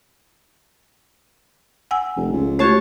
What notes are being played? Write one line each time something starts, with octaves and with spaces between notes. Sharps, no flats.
F#5 G#5 E6
F1
C#2
A3 F#4 G4 C#5 A5